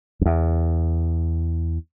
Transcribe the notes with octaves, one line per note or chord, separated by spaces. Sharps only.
F#2
E2